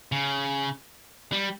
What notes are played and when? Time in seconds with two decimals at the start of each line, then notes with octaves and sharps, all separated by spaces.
0.12 C#3
1.32 G3